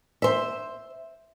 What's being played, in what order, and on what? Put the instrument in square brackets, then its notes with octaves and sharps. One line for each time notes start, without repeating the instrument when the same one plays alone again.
[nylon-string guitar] C5 E5